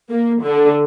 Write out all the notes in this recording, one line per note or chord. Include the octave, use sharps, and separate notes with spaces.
A#3
D3